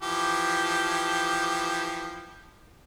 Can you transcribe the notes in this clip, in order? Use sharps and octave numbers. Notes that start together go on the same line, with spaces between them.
E3 F3 G4